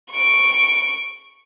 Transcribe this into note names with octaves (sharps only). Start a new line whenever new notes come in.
C#6 D7